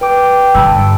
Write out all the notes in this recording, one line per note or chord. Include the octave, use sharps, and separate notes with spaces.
B4 G5 D6
G2 D3 A5 B5 E6